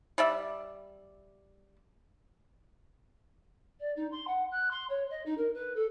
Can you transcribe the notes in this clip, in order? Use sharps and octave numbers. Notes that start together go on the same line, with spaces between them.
G3 D5 E5
D5
D#4
C6
F#5
F#6
C6
C#5
D#5
D#4
A#4
B4
A4